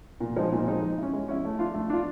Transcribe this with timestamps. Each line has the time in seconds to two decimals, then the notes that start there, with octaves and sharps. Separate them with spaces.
0.20 A#2
0.36 F3 G#3 C4 D#4
0.52 A#2
0.67 F3 G#3 C4 D#4
0.82 G#3
0.98 C#4 E4
1.13 G#3
1.28 C#4 E4
1.45 A3
1.59 D4 F4
1.74 A3
1.90 D4 F4